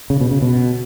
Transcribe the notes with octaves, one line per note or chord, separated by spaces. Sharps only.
C#3
B2
C#3
B2